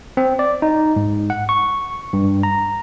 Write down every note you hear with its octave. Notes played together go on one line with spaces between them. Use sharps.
C4
D5
D#4
G#2
F#5
C#6
G2
A#5